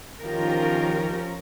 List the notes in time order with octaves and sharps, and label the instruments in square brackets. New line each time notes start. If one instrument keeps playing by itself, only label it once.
[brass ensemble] D#3 [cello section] F3 C#4 A#4 [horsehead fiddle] F4 G4